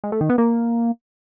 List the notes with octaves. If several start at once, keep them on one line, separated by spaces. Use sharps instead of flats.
G#3
A3
D#3
B3
A#3